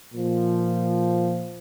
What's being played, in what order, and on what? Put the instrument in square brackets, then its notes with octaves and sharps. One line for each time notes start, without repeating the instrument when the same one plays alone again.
[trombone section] A#2 F3